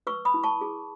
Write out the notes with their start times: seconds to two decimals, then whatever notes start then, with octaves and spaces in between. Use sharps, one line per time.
0.07 B4 C#6 E6
0.25 B5 D#6
0.34 E4
0.43 A5 C#6
0.61 G#4